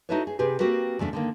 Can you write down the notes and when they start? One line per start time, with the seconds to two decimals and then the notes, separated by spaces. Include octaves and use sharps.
0.09 D#4 E4 F#4 A4 B4 C#5
0.27 G#4
0.39 C3 G4 G#4 B4
0.59 A#3 C4 F#4 G4 A#4 B4
0.99 E2 C#3 A3 D4
1.13 D3 D#3 A#3